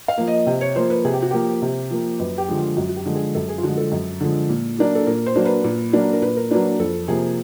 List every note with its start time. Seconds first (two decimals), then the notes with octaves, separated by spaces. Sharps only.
0.08 F5
0.18 F3 A#3
0.27 D#5
0.47 C3
0.61 C#5
0.76 F3 A#3 C5
0.90 B4
1.05 C3 G#4
1.13 G4
1.22 F#4
1.31 F3 A#3 G4
1.62 C3
1.90 F3 A#3
2.19 F#2 B4
2.38 G4
2.48 D3 F3 G#3
2.58 F4
2.76 F#2 F#4
2.89 F#4
2.96 G4
3.06 D3 F3 G#3
3.15 G#4
3.34 F#2 A4
3.49 G#4
3.58 F4
3.63 D3 F3 G#3 F#4
3.77 A4
3.92 F#2
4.21 D3 F3 G#3
4.49 A#2
4.78 F#3 A#3 D4
4.95 A4
5.06 A#2 A#4
5.26 C5
5.36 F#3 A#3 D4
5.45 B4
5.64 A#2
5.93 F#3 A#3 D4
6.13 A#4
6.22 A#2 B4
6.36 A#4
6.51 F#3 A#3 D4 B4
6.79 F2 A4
7.08 C3 F3 A#3 G#4